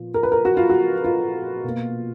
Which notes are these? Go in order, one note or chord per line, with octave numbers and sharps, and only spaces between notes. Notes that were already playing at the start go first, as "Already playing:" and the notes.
Already playing: A#2 F3 B3
A#4
B4
A#4
F#4
F4
F#4
F4
B2 A#3